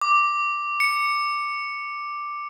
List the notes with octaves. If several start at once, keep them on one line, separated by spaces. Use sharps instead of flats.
D6
C#7